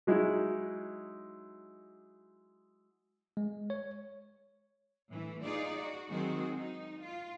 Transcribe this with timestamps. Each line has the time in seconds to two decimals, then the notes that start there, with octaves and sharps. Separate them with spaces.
0.07 F#3 G#3 D#4 E4
3.37 G#3
3.70 C#5
5.11 A2 E3
5.43 D#4 F4 G#4 D5
5.80 F#4
6.10 D#3 F#3 G#3 C4 F#4 G#4
6.56 D#4
7.03 F4